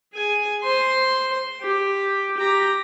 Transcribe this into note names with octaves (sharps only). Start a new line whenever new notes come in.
G#4 G#5
C5 C6
G4
G4 A#5